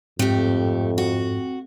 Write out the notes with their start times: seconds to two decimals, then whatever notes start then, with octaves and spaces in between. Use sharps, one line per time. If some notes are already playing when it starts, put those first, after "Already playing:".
0.19 F2 G#2 A3 C4 G4
0.98 F#4